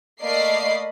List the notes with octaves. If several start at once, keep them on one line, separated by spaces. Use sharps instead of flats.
A3 A#3 D5 D#5 B5 C7